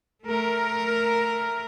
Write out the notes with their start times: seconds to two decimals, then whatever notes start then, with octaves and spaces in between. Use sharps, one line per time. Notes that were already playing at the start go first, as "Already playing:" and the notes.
0.25 A3 A#4